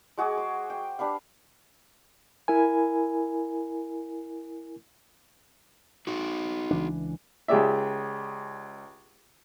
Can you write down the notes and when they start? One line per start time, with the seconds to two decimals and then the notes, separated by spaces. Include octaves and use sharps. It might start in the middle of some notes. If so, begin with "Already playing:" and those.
0.17 G#3 F#4 G#4 D6
0.37 C5
0.70 G5
0.99 D4 G4 B4 F5
2.48 E4 A#4 G#5
6.07 D#4 F#4
6.71 C#2 E3 D4
7.48 C#2 C#3 G4 G#4 D5 E5